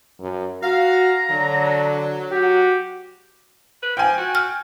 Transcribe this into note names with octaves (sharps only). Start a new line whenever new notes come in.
F#2
F#4 F5 A#5
D3 F#3
F#4 G4
B4
F3 G5 G#5
F#4
F6